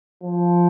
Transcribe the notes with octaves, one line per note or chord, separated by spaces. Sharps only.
F3